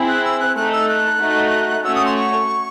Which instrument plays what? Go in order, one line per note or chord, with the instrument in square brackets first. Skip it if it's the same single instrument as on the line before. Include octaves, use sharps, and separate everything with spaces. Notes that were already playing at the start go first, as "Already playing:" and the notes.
Already playing: [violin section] C4 E4 G#4
[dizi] F#6
E6
F#6
[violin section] A3 D#4 A4 [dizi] F#6
[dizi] E6
F#6
[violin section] A3 D#4 F#4
[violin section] A3 C#4 F#4 C#5 [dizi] E6
[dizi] D#6
C6
C#6